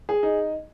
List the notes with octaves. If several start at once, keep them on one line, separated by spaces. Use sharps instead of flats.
G#4
D#4